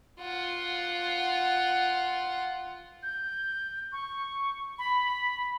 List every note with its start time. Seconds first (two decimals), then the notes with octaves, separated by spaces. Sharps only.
0.20 F4 F#5
3.03 G6
3.92 C#6
4.79 B5